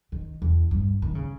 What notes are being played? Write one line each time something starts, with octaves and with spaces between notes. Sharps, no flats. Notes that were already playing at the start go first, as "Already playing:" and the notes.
D#3
E2
G2
D#3
C#3